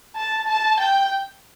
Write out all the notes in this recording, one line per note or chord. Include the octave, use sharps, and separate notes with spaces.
A5
A5
G5